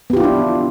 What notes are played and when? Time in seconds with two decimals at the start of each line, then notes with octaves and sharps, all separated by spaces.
0.10 B3
0.13 G4
0.17 F4
0.20 E4
0.23 D4